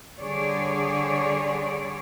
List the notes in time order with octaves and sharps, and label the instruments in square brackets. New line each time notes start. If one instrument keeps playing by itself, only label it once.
[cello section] D3 G3 G#4 C#5 D5